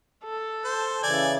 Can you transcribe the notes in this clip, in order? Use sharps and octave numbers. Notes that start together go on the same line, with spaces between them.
A4
C5
C#3 E3 D5 G#5